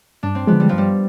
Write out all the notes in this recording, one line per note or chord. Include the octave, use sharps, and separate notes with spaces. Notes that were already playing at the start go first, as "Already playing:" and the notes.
G2 D4
C4
D3 F3 G#3 B3
G3
G2 F3
G3